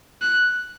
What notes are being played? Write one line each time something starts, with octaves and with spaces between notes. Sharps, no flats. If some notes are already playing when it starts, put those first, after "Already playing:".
F#6